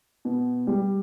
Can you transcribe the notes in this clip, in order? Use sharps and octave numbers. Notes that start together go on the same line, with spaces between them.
B2
G3